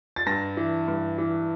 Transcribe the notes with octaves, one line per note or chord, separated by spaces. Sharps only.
A6
G2 A#6
E3
G2
E3